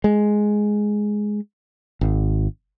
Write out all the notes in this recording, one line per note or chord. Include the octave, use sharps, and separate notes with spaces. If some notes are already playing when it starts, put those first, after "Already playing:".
G#3
G#1